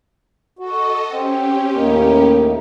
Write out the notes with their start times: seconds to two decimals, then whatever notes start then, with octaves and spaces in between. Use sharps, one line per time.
0.59 F#4 A4 D#5
1.10 C4 C#4 G4
1.75 D#2 A2 A#3 D#4